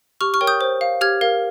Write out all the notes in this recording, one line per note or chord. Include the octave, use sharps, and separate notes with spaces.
G4 C#6 F6
C#6 F6
A#4 C#5 G5
D#6 G6
C5
F5
G4 F6 G#6
A#4 F5